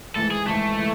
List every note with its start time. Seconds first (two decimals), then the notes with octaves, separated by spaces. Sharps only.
0.15 G#1 G#2 E3 A4
0.31 G#4
0.47 G#1 G#2 E3 A3
0.78 E3